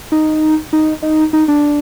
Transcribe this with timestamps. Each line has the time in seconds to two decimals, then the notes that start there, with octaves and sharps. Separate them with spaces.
0.12 D#4
0.73 D#4
1.02 D#4
1.33 D#4
1.48 D4